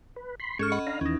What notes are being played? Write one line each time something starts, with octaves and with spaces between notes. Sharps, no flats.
B4
B5 C6
G#2 G#3 C#4 A4 C#6 F6
D#5 F#5 B5
D4 F5 A#5
D#2 E3 C#4 D#4